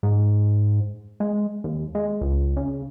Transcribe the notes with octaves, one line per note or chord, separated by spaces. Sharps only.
G#2
G#3
D#2
G#3
C#2
C#3